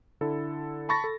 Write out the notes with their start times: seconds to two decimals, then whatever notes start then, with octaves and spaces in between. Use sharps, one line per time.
0.21 D3 E4 A4
0.89 A5 B5 C#6 A6 A#6
1.04 A4